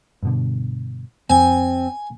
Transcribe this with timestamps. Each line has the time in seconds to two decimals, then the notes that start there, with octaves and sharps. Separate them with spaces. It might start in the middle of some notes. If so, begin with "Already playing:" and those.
0.23 G2 B2 D3
1.30 F2 C4 G#5